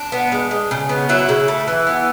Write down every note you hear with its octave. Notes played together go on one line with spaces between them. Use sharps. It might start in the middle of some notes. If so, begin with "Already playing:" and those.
Already playing: D4
B3
G#3
G#3
C#3
B3
F#3 E4
C#3
A3
E3
B3